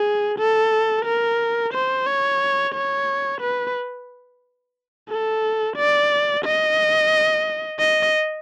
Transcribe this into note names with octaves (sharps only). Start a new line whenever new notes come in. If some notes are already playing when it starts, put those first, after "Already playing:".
Already playing: G#4
A4
A#4
C5
C#5
C#5
B4
A4
D5
D#5
D#5